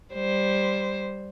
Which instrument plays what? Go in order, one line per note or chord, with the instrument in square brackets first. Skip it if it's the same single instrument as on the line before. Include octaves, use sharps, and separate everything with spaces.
[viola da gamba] G3 C5